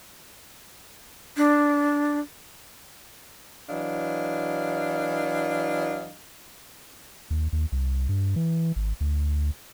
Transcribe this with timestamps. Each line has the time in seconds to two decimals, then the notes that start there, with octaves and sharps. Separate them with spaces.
1.37 D4
3.70 E3 F#3 D4 D#5 F5
7.30 D#2
7.53 D#2
7.72 C2
8.09 G2
8.36 E3
8.76 G#1
9.00 D2